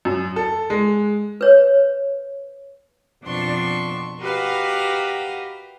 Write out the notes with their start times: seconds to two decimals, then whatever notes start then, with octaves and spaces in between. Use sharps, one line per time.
0.05 F#2
0.36 A4
0.70 G#3
1.41 B4 C#5
3.22 F2 B2 F3 D4 C6 C#6
4.20 F#4 G4 A#4 B4 D#5 F5